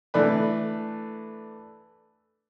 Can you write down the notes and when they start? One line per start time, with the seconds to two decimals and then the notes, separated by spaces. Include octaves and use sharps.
0.14 E3 A3 D4 B4